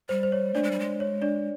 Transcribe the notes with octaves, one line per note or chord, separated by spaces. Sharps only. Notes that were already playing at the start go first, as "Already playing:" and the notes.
G3 C5
C5
C#5
A3 D4 D5
G#3
G3
G#3
C#5
D4 D5